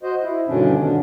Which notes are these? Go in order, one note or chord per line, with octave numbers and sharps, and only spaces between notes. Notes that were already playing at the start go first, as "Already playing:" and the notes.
F#4 C5 D#5
E4
G2 B2 D3 D#3 C#4 D4
B3 D4